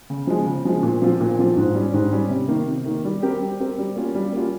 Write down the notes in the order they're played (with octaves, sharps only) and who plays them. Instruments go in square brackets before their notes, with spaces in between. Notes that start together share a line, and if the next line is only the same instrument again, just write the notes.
[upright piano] C#3
F3 G#3
C#3
F3 G#3
A#2
F3 C4 F4
A#2
F3 C4 F4
G#2
G3 C#4
G#2
G3 C#4
C3
D#3 A#3
C3
D#3 A#3
G3
C4 G4 A#4
G3
C4 G4 A#4
G3
A#3 C#4 F4
G3
A#3 C#4 F4